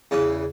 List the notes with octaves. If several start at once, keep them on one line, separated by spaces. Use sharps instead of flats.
E2 C#3 E3 C#4